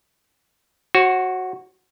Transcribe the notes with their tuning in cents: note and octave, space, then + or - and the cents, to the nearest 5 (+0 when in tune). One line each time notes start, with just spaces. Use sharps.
F#4 +0 C#5 -45